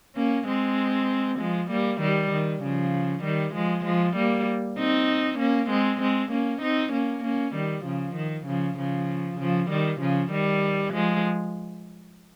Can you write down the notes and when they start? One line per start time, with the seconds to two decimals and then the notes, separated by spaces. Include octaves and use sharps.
0.16 A#3 C#4
0.48 G#3 C4
1.39 F3 G#3
1.71 G3 A#3
2.01 D#3 G3
2.32 D#3
2.63 C#3 F3
3.24 D#3 G3
3.54 F3 G#3
3.85 F3 G#3
4.16 G3 A#3
4.78 C4 D#4
5.39 A#3 C#4
5.70 G#3 C4
6.01 G#3 C4
6.31 A#3 C#4
6.62 C4 D#4
6.93 A#3 C#4
7.24 A#3 C#4
7.55 D#3 G3
7.85 C#3 F3
8.16 D#3
8.47 C#3 F3
8.78 C#3 F3
9.39 C#3 F3
9.70 D#3 G3
10.01 C#3 F3
10.32 D#3 G3
10.93 F3 G#3